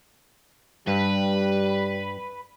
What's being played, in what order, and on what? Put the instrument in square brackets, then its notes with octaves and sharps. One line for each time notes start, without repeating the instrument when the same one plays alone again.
[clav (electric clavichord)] G2 [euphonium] G3 [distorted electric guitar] B4